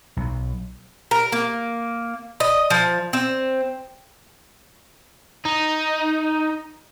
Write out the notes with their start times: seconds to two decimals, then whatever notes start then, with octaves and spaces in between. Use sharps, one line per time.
0.17 B1
1.11 A#4
1.32 A#3
2.40 D#5
2.70 F3
3.13 C4
5.45 D#4